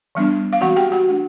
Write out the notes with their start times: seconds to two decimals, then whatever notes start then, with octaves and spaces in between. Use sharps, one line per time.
0.15 E3 G3 B3 D4
0.53 F5
0.61 E3 G#3 C4 F#4 F#5
0.76 G4 G5
0.92 F#4 F#5
1.08 E3 A3 D4